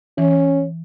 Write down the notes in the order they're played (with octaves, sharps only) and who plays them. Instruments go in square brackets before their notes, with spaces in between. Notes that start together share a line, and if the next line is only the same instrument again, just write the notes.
[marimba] E3 [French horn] C#4